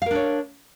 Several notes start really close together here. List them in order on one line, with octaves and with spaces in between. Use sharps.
F5 A#4 D4 C#5